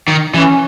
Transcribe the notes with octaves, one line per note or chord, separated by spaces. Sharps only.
D#3
E3 C#4